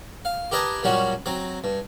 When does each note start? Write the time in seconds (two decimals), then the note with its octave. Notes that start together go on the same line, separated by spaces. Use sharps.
0.25 F5
0.51 G4 A#4 B4 D#5 G#5 A5
0.83 A#2 F#3 G3 C#4 F#4
1.26 F#3 C4 A#5
1.64 G2